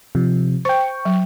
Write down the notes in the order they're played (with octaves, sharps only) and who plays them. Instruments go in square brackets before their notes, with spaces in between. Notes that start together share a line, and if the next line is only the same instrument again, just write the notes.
[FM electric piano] C3 F3
[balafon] C5 [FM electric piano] G5 C#6
[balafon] F#3